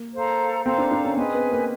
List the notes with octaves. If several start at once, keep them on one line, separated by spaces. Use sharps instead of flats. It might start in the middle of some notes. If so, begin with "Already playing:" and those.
Already playing: A#3
A4 C5 F5 A#5
C4 A4 C5 F5 A#5
D4
D4
C#4
C4 G#4 B4 D#5 G#5
B3
A#3